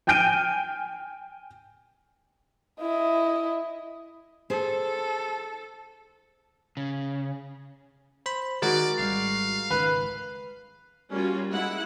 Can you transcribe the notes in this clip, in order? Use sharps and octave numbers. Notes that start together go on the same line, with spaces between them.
G5 G#5 F6 G6 D7 D#7
E4 D#5
G#4 A4 C5
C#3
C5 B5
D#3 G#3 F#4 A#4 D5
G#1 D3 G3 F5
G#1 C#2 D#3 B4
G3 A#3 C#4 F4 F#4
G#3 E4 F#5